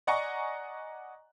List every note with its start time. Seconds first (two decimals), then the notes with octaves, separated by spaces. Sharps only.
0.07 D5 D#5 F#5 G#5 A#5 C#6